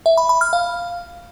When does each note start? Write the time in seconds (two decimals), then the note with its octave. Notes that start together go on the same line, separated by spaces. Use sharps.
0.06 E5
0.17 B5
0.29 B5
0.41 F6
0.53 F5